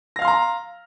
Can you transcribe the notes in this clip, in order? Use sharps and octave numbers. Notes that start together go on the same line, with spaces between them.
F5 A#5 C6 F6 A#6